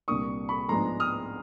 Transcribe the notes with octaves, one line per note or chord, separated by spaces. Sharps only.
C2 A#2 G3 A#3 D4 C#6 D#6
B5 C#6
G#2 F3 G#3 B3 D4 A#5 C6
D#6 F6